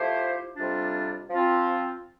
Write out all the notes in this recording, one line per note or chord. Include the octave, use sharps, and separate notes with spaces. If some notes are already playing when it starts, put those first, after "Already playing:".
Already playing: F3 A3 E4 G4 C5
F2 C3 G3 D4 F4
F3 C4 F4